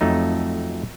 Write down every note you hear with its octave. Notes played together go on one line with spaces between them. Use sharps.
F2 F#3 A3 D#4